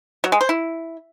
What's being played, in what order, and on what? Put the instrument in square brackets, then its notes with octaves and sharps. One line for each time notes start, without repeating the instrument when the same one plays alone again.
[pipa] F#3
G#3
C5
E4